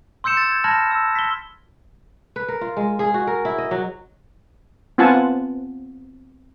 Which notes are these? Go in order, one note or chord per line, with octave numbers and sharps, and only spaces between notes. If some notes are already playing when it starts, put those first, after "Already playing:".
C6 E6 G6 C#7 E7
A6
G6 G#6
A5 B5 F6 G#6 A#6
E6
B6 G7
B4
A#4
F4
G#3
G#4
F#4
A#4
E4
D#5
F#3
B3 C4 F4 F#5 G#5 A5